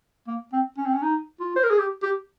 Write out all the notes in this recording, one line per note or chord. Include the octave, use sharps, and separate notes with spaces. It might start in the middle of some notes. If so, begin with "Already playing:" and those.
A#3
C4
C#4
C4
C#4
D#4
F4
C5
A#4
G#4
G4
G4